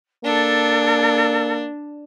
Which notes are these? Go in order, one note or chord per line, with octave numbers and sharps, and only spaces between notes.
A#3 D4 A4